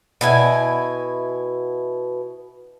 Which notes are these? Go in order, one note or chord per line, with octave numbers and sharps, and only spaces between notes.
B2 E4 G#5